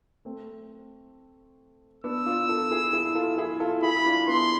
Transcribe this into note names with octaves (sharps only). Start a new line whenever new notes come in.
A3 C4
B3 D4 E6
D4 F4
F4 A4
E4 G#4
E4 G#4
F4 A4
E4 G#4
F4 A4
E4 G#4 B5
E4
D4 F4
B3 D4 C6